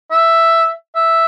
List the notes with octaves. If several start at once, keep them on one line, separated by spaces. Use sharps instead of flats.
E5
E5